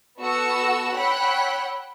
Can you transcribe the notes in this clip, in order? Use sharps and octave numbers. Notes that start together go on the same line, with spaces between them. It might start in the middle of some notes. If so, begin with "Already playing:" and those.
B3 F#4 A4 F#5 C#6 E6
C#5 F#5 G5 B5 E6 F#6